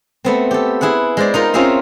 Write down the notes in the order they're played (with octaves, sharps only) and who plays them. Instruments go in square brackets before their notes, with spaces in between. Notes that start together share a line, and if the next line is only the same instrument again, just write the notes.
[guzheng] A3 B3 C4
G4 A4
E4 G#4 B4 F#5
G#3 C5 D5
D#4 F4 A#4
C4 C#4 F4 G#4 E5 F5